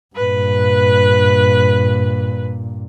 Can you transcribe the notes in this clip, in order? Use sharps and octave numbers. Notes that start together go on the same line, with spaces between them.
G2 A#2 B4